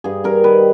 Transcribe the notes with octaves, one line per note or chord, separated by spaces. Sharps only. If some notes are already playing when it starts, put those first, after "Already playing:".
G2 G#4
G2 A#4
D#3 B4